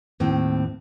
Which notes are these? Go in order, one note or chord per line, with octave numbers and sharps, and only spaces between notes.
D#2 A2 C4